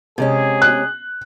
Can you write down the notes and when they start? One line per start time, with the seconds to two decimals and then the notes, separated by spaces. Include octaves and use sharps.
0.18 C3 G#3 C#4 G#4
0.62 F#6